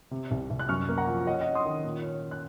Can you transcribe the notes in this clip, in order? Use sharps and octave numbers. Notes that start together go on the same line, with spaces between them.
C3
C2
C2
F#6
F#2 C#6 F6
A#3
F#5 A#5
F3
C#4 D#5 F#5
D#5 F#5
C#4
C6 D#6
D#3
A#2
C#4
C#4
F#6